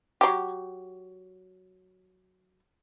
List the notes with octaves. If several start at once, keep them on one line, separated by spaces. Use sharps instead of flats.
F#3 G4